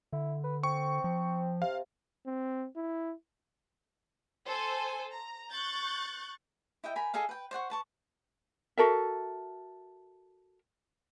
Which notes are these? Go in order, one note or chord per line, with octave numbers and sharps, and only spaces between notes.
D3 E4
B4
C4 C#6
F3
C3 F5
C4
E4
A4 C5 G#5
A#5
C#6 F#6 G6 A6
E4 D#5 E5 G5
A#4 G#5 B5
G#4 A4 D#5 F5
B4 G5
C5 D5 F#5 C#6
B4 A5 C#6
F#4 A4 A#4 E5